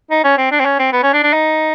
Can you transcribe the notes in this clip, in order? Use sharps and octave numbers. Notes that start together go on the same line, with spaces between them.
D#4
C#4
C4
D4
C4
C#4
C4
B3
C#4
D4
D4
D#4